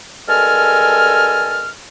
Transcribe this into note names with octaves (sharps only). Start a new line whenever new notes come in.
G2 G#3 A4 A#4 G#5 F6